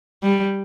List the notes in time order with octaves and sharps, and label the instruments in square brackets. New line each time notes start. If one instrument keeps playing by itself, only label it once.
[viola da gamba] G3